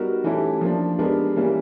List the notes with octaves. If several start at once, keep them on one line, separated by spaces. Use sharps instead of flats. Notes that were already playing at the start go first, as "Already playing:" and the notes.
Already playing: G3 B3 D#4 F#4 A#4
E3 A3 C#4 E4 G4
F3 A#3 D4
G#3 B3 D4 G4 A#4
E3 G3 A#3 C#4